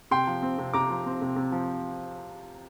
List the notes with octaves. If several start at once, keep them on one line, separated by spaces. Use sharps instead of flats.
C3 G5 C6
F3
C4
C3
C3 A#5 D6
F3
C4
C3
C3
F3